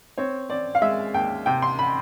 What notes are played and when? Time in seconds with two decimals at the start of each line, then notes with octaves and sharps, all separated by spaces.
0.18 C4 C#5
0.49 C4 D5
0.75 F5
0.82 G#3 E5
1.14 D#2 G5
1.46 C3 G5
1.62 C6
1.79 B5